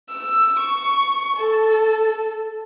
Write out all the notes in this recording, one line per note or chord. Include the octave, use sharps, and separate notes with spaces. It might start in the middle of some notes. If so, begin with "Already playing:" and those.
E6
C#6
A4